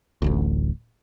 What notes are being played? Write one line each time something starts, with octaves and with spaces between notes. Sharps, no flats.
D1 A1 D2